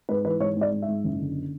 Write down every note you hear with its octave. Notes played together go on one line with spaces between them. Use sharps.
G#2 B4
E3 B4
G#2 C#5
G#2 D5
G#2
E5
G#2
F#1
D3